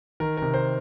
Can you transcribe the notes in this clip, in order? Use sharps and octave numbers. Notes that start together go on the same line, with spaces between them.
D#3 A#4
C3 A#4
C5